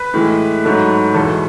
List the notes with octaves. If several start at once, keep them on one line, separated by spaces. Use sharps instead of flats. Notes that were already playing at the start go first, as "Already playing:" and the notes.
Already playing: B4
A2 E3 G#3
G#2 F#3 A3
E2 B2 G#3 A4